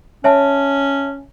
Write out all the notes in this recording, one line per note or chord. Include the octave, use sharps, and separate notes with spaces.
C#4 C#5 E5 A5